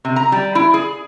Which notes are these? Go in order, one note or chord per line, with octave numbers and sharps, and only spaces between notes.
C3
A#5
G3
E4
G#4